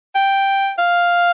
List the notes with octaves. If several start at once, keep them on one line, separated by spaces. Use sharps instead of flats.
G5
F5